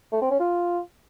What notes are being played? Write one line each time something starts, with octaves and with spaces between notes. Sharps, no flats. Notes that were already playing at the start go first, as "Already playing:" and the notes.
A3
C4
C#4
F4